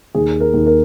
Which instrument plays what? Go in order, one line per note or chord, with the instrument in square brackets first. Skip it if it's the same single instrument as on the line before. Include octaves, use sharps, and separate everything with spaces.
[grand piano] D#2 G#4
A#4
D#2
A#4